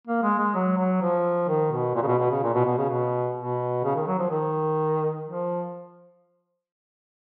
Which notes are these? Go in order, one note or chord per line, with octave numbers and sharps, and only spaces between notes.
A#3
G#3
G#3
F#3
F#3
F3
D#3
B2
A#2
C#3
B2
B2
C#3
A#2
B2
B2
C#3
B2
B2
C#3
D#3
F#3
F3
D#3
F3